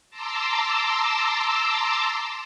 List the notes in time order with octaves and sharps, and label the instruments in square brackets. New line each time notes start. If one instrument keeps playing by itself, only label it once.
[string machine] A5 A#5 C6 D6 E6